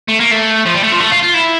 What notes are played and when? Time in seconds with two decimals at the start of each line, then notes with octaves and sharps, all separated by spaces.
0.08 A3
0.20 A#3
0.31 A3
0.65 F3
0.74 G3
0.83 A3
0.92 F3
1.00 A3
1.11 F4
1.23 F4
1.34 E4